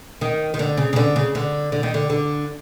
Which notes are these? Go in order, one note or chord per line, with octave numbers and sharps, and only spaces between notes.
D#3
D#3
D3
C#3
C#3
D3
C#3
D3
D3
D#3
D3
D3